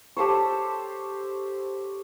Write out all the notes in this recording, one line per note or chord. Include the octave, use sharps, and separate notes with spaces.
G4 A4 C5 C#5